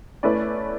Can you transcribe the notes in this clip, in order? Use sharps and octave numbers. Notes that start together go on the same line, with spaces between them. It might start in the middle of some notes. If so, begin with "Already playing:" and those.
A3 C#4 E4 B4 D5